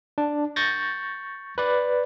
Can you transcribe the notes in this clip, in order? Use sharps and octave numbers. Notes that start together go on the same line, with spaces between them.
D4
C#6 G6 A6 A#6
B4 D5